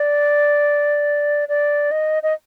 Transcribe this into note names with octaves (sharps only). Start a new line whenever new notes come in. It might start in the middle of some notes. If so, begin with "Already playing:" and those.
Already playing: D5
D5
D#5
D#5